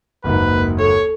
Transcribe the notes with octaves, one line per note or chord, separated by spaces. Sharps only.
F#1 D#2 G#2 B4
A4 C#5